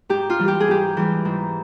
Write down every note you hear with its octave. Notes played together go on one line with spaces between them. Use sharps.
G#2 G4
F4
E3 G3
G4
G#4
G#2 G4
E3 G3
G#2